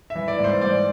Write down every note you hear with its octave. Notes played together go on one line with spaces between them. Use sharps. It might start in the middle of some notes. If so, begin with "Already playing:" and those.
E5
E3
D5
G#2 C5
G#2 D5